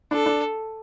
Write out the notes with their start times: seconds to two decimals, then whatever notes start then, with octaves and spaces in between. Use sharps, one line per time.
0.11 D4 A4
0.26 D4